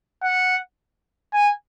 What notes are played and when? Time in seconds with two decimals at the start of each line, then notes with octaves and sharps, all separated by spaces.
0.23 F#5
1.34 G#5